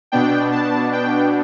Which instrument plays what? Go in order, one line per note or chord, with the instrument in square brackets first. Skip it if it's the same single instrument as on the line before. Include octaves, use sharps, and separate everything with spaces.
[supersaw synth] B2 B3 D4 G5
A5
G5